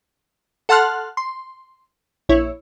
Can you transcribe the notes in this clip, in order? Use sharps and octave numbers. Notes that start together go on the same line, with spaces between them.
A4 F#5 A5 C6 F6 F#6
C6
A#1 E4 C#5